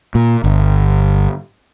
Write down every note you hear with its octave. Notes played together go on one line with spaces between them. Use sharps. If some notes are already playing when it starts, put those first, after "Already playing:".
A#2
G1